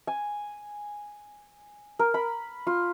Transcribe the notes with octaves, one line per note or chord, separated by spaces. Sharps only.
G#5
A#4
B5
F4